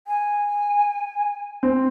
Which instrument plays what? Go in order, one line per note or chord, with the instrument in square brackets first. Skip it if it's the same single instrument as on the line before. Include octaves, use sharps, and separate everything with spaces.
[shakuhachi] G#5
[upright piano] C4